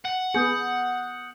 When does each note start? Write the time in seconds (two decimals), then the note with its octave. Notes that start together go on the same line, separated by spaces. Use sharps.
0.05 F#5
0.34 B3 G#4 D#6 G6 C#7